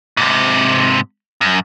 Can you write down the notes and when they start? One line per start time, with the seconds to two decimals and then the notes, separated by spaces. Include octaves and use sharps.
0.17 G#2 C3
1.41 F#2